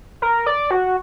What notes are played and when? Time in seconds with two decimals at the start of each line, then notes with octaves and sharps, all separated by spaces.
0.22 A#4
0.46 D5
0.71 F#4